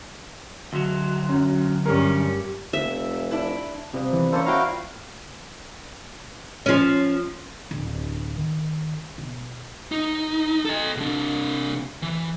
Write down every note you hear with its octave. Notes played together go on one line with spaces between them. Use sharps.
D2 F#3 C6
F#2
G2 C#4 G4 A#4
F1 E5
D4 E4
C3 F3 G3 B3
E3
A#3 C#4 A4 C5 C#5
A#2 E4 F#4 F5 G5 A#5
F3 C#4
D1
D#3
B2
D#4
A4 D#5
C3 D4
E3